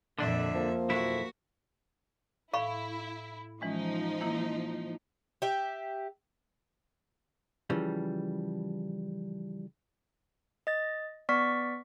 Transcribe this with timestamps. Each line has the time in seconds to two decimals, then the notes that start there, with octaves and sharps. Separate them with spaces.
0.19 F2 A#2 D3 D4 E5
0.55 F3 A#3
0.89 B1 F2 E4 F#4
2.54 A2 E4 F5 B5 C#6
3.61 E3 F3 G#3 C#4 D#4
4.21 E3 A#3 E4
5.42 G4 E5
7.70 C#3 E3 F3 G3
10.67 D#5 A6
11.29 B3 D5 C#6 B6